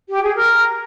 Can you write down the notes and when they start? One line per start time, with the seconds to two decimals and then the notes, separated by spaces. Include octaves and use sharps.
0.10 G4
0.23 G#4
0.35 A#4